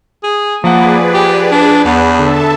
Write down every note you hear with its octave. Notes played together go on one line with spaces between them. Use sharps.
G#4
F3 A#3 G#4 B4 D5 F#5
G4
D4
E2
D3 A4 E5 A5